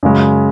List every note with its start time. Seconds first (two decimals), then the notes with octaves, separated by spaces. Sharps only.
0.03 F#2 C#3 G#3